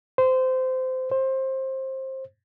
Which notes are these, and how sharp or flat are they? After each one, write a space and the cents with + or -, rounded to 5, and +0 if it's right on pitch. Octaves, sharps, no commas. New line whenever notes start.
C5 -20
C5 +20